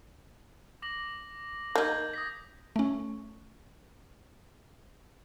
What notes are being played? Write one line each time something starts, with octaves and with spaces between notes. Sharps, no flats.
D6 A#6 F#7
A#3 D#4 G6 G#6
D#6 A#6 B6
A3 C#4